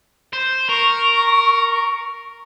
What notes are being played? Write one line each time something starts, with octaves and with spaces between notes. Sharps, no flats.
C5
A#4 C#6